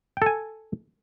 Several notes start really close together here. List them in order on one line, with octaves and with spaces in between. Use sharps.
G5 A4 G#5